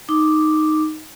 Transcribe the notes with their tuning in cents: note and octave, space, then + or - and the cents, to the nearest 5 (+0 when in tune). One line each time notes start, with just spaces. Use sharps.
D#4 +0 D6 +0